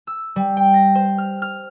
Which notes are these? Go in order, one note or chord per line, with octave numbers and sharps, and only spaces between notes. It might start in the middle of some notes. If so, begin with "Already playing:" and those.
E6
G3
G5
A#6
C5
F6
F6